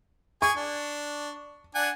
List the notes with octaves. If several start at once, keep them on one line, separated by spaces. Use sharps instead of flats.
G#4 G#5 C#6
D4
D4 F#5 G#5